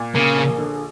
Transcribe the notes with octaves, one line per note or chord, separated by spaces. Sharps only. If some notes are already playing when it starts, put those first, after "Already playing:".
Already playing: A#2
C#3 A#3
A#1
D3